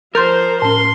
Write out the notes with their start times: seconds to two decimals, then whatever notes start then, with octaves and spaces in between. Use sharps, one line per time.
0.15 F3 A#4 C5 C6 G6 A6
0.62 A2 C#4 C6